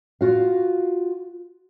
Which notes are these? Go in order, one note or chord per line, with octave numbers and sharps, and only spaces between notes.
F4 F#4 F5